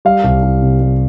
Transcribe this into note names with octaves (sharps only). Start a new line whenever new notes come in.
G3 F5
C2
C2
C3
G3